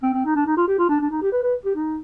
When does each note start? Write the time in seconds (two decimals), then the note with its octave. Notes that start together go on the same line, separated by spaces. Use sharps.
0.03 C4
0.13 C4
0.25 D#4
0.36 D4
0.46 D#4
0.57 F4
0.68 G4
0.78 F4
0.89 D4
1.00 D4
1.11 D#4
1.22 G4
1.32 B4
1.43 B4
1.65 G4
1.75 D#4